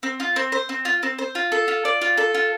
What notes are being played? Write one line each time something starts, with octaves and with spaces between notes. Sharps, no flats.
C4
F4
C4
C5
C4
F4
C4
C5
F4
A4
F4
D5
F4
A4
F4